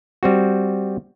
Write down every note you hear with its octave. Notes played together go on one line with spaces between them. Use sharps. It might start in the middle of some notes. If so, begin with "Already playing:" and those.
G3 C4 F#4